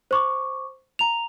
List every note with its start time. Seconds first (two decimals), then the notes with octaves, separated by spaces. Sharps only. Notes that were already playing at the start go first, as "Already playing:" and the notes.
0.11 C5 C#6 D6
0.99 A#5 F7